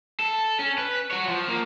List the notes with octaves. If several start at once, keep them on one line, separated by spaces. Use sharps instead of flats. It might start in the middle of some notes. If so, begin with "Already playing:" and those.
A4
C#4
B4
F#4 C#5
F3
A#3